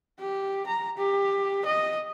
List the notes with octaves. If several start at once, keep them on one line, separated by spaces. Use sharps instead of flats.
G4
A#5
G4
D#5